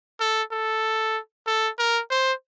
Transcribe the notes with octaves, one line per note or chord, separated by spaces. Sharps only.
A4
A4
A4
A#4
C5